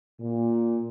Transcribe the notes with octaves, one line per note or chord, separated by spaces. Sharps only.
A#2